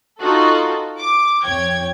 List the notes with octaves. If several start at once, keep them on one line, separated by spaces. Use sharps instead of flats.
D#4 F4 F#4 A4
D6
F2 C#5 G5 G#6